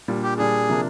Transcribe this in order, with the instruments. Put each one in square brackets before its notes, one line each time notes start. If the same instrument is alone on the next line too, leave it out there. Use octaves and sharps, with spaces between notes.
[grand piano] A#2 G3 D4
[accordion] G4
[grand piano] A#2 G3 D4 [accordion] G#4
[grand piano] C3 F3 A#3 D4